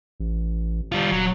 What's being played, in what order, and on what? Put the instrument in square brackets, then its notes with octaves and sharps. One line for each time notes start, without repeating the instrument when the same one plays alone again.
[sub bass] A1
[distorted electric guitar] G3 F4
[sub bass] D#1 [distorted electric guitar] F#3